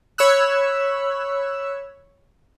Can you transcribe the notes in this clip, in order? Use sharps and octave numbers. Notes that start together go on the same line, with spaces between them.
C#5 B5 E6 F#6